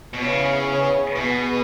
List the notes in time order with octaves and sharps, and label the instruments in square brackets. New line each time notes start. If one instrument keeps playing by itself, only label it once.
[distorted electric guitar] B2
[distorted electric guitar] C#3 [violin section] B3 E4 G#4 C#5
[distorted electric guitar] B2 [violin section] B3 G#4 B4